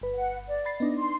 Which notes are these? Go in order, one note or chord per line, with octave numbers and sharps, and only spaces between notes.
G1 B4
F#5
D5
B5 A6 C7
B3 D4 D#4 D#5
C6